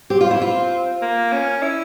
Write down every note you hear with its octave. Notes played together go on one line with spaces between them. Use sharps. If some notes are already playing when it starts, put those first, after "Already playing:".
C4 G4
F4
E4
F4
A#3
C#4
E4